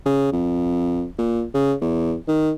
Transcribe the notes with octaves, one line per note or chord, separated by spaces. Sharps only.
C#3
F2
A#2
C#3
E2
D#3